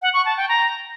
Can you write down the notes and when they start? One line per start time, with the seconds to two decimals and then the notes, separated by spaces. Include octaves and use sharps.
0.02 F#5
0.14 C#6
0.25 A5
0.37 G5
0.49 A#5